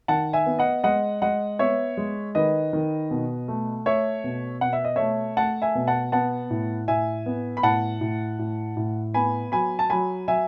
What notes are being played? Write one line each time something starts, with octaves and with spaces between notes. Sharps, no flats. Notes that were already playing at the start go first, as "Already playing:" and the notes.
D#3 F#5 A5
E5 G#5
B3
D#5 F#5
G#3 D#5 F#5
G#3 D#5 F#5
B3 C#5 E5
G#3
D#3 B4 D#5
D#3
B2
A3
A3 C#5 E5
B2
B2 F#5
E5
D#5
A3 C#5 E5
A3 F#5 A5
E5 G#5
B2
F#5 A5
B3 F#5 A5
A2
A2 E5 G#5
B3
B5
A2 F#5 A5
A2
A2
A2
B3 G#5 B5
F#3 G#5 B5
A5
F#3 G#5 B5
F#3 E5 G#5